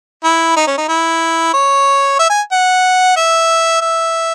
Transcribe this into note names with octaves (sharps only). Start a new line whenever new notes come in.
E4
D#4
C#4
D#4
E4
C#5
E5
G#5
F#5
E5
E5